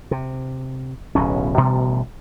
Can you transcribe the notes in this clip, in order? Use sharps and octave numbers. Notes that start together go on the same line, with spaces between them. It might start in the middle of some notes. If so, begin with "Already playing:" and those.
C3
D1 B1 B2 C#4
A1 B2 D3 G3